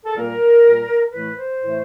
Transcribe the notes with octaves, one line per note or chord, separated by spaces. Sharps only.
A4
A#2 G3 A#3 A#4
A#2 G3 A#3
A2 E3 A3 B4
C5
A2 E3 A3